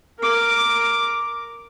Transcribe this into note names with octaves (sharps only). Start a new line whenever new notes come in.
A#4 D6